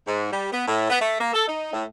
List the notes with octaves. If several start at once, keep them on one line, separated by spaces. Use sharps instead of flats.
G#2
G3
B3
A2
B3
A3
A#3
A4
D#4
A2